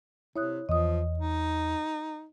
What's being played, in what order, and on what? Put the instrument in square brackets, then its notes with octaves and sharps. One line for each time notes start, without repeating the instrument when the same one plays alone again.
[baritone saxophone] C3 [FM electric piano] E4 [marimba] C#5 D#6 F#6
[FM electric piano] E2 [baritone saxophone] F3 [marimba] D#5 D#6
[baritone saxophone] D#4